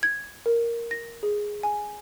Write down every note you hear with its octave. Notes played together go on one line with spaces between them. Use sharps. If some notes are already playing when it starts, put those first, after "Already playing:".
G#6
A#4
A#6
G#4
G#5